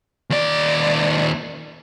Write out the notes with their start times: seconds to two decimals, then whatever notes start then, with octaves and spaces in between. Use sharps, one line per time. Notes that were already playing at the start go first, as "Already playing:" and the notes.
0.30 D#2 D5